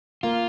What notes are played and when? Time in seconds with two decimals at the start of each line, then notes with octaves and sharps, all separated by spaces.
0.23 A#3 F4